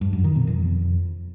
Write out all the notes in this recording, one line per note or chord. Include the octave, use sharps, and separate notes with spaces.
G2
F#2
D#3
B2
F2